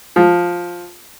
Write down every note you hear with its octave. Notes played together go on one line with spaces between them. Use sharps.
F3